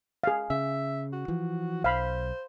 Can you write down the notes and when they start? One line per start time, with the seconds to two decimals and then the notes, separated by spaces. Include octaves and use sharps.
0.24 G#4 F5
0.50 C#3 E5
1.13 F#4
1.28 E3 F3
1.84 B1 C5 F5 B5